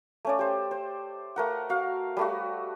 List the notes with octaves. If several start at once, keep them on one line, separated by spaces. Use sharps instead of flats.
A3 C#4 D5
G4 C5
C5
A3 A#4 F#5
F#4 F5
G3 A3 F#4